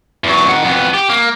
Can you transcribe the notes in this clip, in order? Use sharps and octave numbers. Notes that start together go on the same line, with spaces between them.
E2 F#3
D#3 F#5
F2 B3
G4
A#3